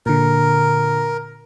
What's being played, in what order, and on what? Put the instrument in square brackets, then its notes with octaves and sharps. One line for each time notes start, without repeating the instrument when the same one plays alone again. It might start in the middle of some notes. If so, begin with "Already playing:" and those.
[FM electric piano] A#2 D3 [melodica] A#4